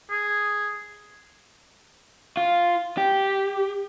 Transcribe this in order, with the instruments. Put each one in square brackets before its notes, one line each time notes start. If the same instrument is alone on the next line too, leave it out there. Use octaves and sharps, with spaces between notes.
[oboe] G#4
[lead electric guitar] F4
G4